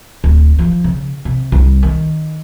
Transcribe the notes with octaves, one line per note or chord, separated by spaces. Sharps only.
D1
F3
C#3
C3
C2
D#3